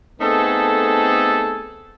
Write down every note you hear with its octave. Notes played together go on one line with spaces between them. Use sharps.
A3 B3 C4 D#4 G#4 A4